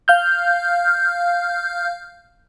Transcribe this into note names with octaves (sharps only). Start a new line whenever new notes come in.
F5 F6 G6